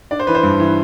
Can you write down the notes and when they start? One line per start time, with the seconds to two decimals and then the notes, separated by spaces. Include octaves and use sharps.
0.11 D4 D5
0.20 C5
0.27 E3 B4
0.35 C5
0.43 G2
0.60 E3